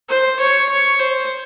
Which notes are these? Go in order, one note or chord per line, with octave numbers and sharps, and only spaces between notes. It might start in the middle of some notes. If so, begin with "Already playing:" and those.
C5
C#5
C#5
C5